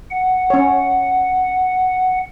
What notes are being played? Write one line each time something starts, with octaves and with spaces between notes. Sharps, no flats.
F#5
C#4 C#5